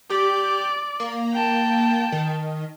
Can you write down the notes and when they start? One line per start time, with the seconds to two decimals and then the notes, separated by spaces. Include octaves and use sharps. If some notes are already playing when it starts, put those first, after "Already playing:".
0.10 G4 D5
1.00 A#3
1.33 G5 A5
2.12 D#3